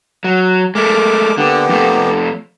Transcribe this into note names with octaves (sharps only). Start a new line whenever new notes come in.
F#3
G#3 A3 A#4 D6
D3 A#3 B3 G4
F2 A3